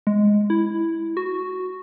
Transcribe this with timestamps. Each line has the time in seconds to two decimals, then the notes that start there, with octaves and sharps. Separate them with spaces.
0.07 G#3
0.50 E4
1.17 F#4